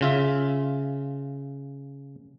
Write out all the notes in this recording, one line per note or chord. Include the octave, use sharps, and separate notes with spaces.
C#3 F4 E5